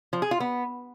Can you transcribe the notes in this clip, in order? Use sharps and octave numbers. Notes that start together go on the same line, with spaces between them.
F3
G#4
F4
B3